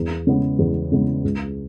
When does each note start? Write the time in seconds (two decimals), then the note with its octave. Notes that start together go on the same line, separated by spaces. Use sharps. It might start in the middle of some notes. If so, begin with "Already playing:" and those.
Already playing: E2
0.27 C#3 G#3 B3
0.59 E2
0.92 C#3 G#3 B3
1.24 C#2